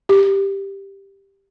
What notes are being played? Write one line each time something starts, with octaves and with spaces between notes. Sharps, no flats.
G4